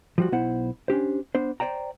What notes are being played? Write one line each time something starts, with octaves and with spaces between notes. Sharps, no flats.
F3 G3 F#4
B1 B3 E4 C5 F#5
C#4 D4 G4 C5
B3 D4 C5
C5 D5 G5 A#5